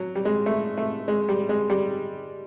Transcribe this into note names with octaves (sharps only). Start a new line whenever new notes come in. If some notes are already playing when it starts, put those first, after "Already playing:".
Already playing: F#3
G3
G#3
A3
A3
G#3
G3
G#3
G3